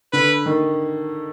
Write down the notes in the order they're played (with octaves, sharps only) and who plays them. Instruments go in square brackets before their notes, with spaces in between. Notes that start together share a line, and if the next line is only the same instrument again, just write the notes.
[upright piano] D3 [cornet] B4
[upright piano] D#3